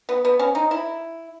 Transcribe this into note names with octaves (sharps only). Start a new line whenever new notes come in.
B3
B3
C#4
D#4
E4